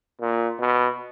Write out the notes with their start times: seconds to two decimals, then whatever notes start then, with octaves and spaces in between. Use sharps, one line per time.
0.21 A#2
0.60 B2